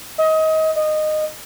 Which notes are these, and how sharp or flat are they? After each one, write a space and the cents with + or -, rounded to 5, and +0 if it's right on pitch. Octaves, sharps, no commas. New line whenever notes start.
D#5 +25
D#5 -15